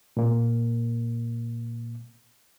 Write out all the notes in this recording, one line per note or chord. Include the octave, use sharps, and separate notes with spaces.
A#2 A#3